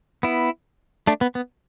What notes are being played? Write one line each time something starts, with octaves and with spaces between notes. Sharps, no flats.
B3 E4
A3 D4
B3
B3